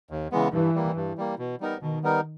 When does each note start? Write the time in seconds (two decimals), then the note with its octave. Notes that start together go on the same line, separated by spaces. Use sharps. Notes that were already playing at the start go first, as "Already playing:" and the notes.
0.10 D#2
0.32 C#3 E3 G#3 B3
0.52 G2 E3
0.75 G3 A#3
0.96 G2
1.18 G3 A#3
1.38 B2
1.60 G3 B3 D#4 A#4
1.82 B2 D#3
2.03 G3 B3 D#4 A#4